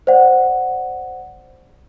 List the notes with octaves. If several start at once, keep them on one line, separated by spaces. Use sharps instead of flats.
C5 D5 F#5